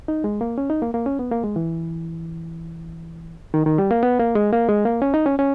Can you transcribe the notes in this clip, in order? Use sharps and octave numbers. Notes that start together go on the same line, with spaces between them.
D#4
G#3
A#3
C#4
D#4
A#3
A#3
C#4
B3
A#3
G#3
E3
D#3
D#3
G3
A#3
B3
A#3
G#3
A#3
G#3
A#3
C#4
D#4
C#4
C#4